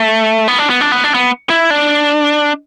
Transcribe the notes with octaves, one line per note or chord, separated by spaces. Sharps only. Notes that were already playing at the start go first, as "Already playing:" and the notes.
Already playing: A3
B3
D4
B3
D4
B3
D4
B3
E4
D4